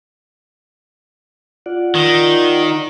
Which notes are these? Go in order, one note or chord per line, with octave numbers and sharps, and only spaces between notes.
F4 D5 F#5
D#3